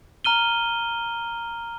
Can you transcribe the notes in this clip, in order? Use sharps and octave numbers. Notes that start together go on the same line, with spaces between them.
A#5 F6 D#7 G7